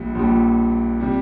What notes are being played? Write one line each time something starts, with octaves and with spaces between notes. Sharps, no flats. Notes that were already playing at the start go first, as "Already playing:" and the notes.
Already playing: A#1 A#2 G3
A#1 A#2 G3
C3 G3